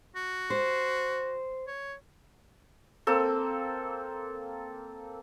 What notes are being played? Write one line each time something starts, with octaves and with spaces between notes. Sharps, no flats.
F#4
C5
C#5
A#3 C4 A4